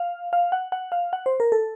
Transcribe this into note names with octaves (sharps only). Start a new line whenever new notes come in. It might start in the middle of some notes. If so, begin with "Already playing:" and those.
Already playing: F5
F5
F#5
F#5
F5
F#5
C5
A#4
A4